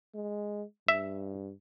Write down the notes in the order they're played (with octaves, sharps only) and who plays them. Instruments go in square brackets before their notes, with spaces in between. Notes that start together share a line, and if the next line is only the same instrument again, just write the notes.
[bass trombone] G#3
[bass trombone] G2 [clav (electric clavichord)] E5